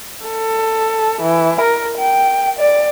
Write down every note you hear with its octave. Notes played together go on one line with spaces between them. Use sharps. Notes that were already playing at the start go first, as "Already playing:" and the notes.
A4
E3
A#4
G5
D5